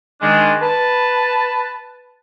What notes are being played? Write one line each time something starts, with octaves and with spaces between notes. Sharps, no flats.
D#3 G#3 D4
B4 A5